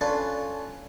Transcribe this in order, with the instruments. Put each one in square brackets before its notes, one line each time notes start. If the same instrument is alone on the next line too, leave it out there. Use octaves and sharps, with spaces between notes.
[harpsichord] C#4 D4 F4 A4 B4